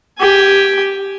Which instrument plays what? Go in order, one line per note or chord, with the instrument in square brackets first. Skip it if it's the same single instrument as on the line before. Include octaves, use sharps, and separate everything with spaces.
[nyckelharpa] G4 G#5